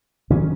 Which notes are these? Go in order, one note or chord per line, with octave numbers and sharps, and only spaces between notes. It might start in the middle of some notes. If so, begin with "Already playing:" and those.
D#3 F#3 C#4